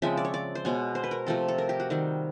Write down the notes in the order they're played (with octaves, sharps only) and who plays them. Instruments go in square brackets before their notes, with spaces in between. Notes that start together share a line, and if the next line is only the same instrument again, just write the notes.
[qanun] C#3 F3 G#3 C4 E5
D5
C#5
D5
C5
B2 G#3 B3 C#5
C5
B4
A#4
C3 F3 A3 C4 A4
A4
A#4
G4
F#4
D#3 G3 C4